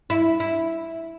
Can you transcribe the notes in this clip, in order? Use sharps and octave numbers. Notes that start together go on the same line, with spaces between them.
E4
E4